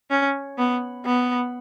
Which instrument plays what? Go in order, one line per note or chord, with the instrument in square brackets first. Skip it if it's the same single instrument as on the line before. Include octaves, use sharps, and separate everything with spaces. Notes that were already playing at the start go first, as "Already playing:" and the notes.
[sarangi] C#4
B3
B3